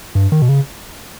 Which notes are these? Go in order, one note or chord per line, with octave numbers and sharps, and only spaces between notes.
G2
D#3
B2
C#3